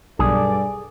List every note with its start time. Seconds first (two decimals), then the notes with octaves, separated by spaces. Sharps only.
0.19 B1 G2 G#4 A4 D5